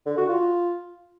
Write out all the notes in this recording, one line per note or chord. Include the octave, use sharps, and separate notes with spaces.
D3
F#4
F4